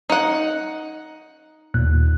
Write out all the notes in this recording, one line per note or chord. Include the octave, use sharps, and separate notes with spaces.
D#4 F#5
D#2 A#2 F#6